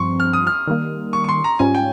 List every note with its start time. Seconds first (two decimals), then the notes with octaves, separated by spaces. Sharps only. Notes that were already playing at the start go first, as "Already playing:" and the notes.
Already playing: G2 F3 C4 C6 C#6
0.20 F6
0.33 D#6
0.47 F6
0.67 D#3 G3 A#3
1.13 C#6
1.24 C#6
1.29 C6
1.44 A#5
1.59 G#2 G3 C#4 F4 G#5
1.75 G5